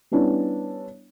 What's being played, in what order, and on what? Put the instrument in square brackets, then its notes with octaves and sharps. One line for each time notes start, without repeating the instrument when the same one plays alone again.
[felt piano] G3 B3 C#4 D4 E4